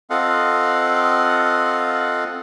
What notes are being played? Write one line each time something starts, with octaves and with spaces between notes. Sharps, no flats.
C4 F4 A4 D#5 F5 F#5